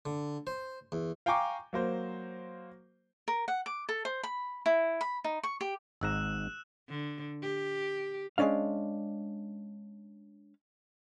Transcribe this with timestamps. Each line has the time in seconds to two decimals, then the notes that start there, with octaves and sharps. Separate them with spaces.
0.06 D3
0.47 C5
0.92 E2
1.26 F5 G5 G#5 A#5 C#6 D6
1.73 F#3 A#3 C5
3.28 A#4
3.48 F#5
3.66 D6
3.89 A4
4.05 C5
4.23 B5
4.66 E4
5.01 B5
5.24 D#4
5.43 C#6
5.61 G4
6.01 G#1 G#2 A#5 E6 F#6 E7
6.89 D3
7.42 G4
8.38 G#3 A#3 C#4 D4 F5